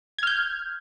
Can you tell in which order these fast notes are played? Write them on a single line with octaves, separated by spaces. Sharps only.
G#6 F6 G6